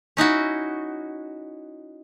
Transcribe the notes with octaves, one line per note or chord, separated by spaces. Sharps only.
C#4 D#4 E4 F#4